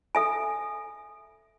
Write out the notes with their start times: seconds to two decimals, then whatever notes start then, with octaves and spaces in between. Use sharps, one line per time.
0.15 A4 E5 G#5